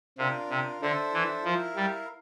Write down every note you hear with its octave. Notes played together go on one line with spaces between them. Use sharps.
C3 D4 F4 A#4 F5
C3
D3 D4 A4 C5 E5
E3
F3 E4 A#4 F5
G3